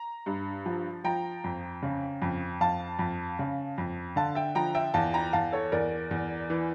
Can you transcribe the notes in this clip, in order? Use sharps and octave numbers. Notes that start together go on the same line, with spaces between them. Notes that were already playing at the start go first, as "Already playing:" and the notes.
Already playing: A#5
G2
F3
F3 G5 A#5
F2
C#3
F2
F2 F5 A5
F2
C#3
F2
D3 F5 A5
E5 G5
F3 G5 A#5
E5 G5
E2 F5 A5
G5 A#5
E2 F5 A5
A4 C#5
E2 A#4 D5
E2
E3